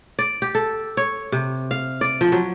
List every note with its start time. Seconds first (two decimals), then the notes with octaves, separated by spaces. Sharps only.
0.19 D5
0.42 G4
0.55 A4
0.97 C#5
1.32 C3
1.71 F5
2.01 D5
2.21 F3
2.32 F#3